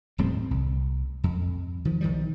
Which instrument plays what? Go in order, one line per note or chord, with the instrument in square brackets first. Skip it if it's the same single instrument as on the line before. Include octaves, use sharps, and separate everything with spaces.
[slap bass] D#1 A2 G3 C4
C2
F2
D#3 F3
B1 D#3 F3 G3